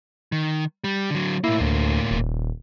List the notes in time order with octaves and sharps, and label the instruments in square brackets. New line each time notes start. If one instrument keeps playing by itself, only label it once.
[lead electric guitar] D#3
G3
D3 F#3
[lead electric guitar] A2 A#3 [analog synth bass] E4
[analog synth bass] D2
D#1